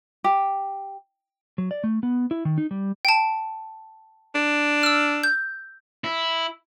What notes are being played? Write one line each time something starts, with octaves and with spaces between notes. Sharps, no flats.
G4
F#3
D5
A3
B3
E4
D#3
D#4
G3
G5 A5
D4
E6 F6
G6
E4